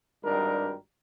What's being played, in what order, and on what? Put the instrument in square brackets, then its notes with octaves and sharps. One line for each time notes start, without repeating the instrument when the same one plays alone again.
[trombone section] G#1 G2 G3 D4 D#4 A#4